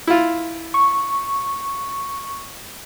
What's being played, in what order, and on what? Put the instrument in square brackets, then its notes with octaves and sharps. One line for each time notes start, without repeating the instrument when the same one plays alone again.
[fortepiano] E4 F4
[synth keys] C#6